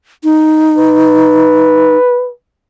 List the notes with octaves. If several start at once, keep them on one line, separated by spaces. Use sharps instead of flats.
D#4
B4